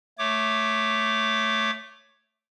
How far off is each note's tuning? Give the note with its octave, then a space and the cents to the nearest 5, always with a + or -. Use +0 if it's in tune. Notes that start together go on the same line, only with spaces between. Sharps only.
A3 +0 C#5 +0 D6 +0